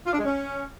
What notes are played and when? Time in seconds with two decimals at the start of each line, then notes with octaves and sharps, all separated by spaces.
0.06 F4
0.13 D4
0.19 G#3
0.25 C#4